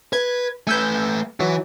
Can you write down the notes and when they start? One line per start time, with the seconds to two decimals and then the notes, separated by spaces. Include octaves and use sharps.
0.13 B4 G#6
0.67 A3 B4 G#5 E6 G6
1.40 E3 F#3